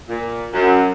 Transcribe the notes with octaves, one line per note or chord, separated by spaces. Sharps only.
A#2
F#2